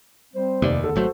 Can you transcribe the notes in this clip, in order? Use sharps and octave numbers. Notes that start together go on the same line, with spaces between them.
G3 C4 C5
F1 D#2 A#3 D5
E2 D3 A4
G#1 F#3 A3 F#4 C5